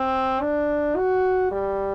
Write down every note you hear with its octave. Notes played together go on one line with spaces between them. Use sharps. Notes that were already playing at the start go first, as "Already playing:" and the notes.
Already playing: C4
D4
F#4
G3